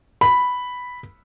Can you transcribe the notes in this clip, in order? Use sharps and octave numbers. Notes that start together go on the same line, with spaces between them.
B5